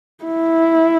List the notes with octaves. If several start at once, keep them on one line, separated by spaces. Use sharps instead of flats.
E4